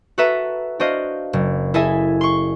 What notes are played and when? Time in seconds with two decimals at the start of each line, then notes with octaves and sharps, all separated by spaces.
0.18 F#4 A4 B4 E5 A#5
0.80 D4 F#4 C5 D#5 F5
1.33 F#1
1.74 E4 G#4 A4 D#5 E5 G#5
2.21 C6 C#6